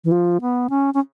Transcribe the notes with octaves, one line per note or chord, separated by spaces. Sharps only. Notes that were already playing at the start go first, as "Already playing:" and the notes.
E3
F3
B3
C#4
C#4